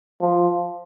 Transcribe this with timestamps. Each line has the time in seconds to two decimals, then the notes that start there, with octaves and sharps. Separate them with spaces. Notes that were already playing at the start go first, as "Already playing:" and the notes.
0.20 F3